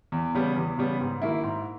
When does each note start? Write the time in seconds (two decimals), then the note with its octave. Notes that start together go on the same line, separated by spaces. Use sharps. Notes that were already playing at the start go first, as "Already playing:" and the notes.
0.12 E2
0.34 C#3 G3 B3
0.56 E2
0.78 C#3 G3 B3
1.00 G#2
1.22 D#3 A#3 E4
1.44 G#2